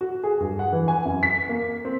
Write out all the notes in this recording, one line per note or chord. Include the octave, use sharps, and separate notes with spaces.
F#4
G#4
G2
F#5
E3
G#5
F#2
B6
A#3
C4